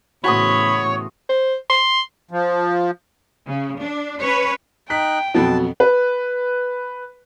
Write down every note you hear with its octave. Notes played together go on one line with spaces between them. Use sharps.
E2 A2 C#3 F#4 C#5 B5 C6 D#6
C5
C6
F3
C#3
D4
C#4 B4 C#5
D#4 G5 F#6 B6
F2 B2 F#3 B3 A5
B4